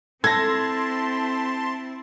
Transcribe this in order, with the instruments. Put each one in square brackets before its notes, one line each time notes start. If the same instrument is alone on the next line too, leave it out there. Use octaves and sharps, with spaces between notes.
[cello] C4 E4 [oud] A4 [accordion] A5 C6 [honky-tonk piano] G#6 A#6